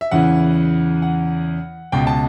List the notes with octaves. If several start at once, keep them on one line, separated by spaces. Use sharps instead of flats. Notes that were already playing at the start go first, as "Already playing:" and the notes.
E5
E2 C#3 E3 F#5
F#5
C#2 B2 G5
A5